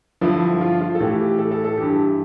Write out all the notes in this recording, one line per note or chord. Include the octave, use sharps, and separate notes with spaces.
G2 D3 F3 E4
F4
F4
A4
A2 E3 G4
G4
A4
A4
A4
G2 E3 G4